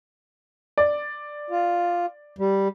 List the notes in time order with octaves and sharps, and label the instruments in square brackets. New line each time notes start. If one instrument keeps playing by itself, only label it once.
[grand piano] D5
[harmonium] F4
G3